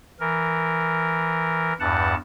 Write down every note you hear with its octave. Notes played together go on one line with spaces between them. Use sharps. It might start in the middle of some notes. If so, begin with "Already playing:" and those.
E3 A#4
E2 G2 F#5 A5